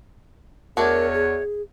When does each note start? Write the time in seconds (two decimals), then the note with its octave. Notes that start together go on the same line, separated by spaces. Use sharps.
0.77 E2 A3 D4 F#4 A#4 C#5
1.14 G#4